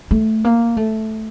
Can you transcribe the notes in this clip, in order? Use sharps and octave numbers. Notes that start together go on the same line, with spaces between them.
A3
A#3
A3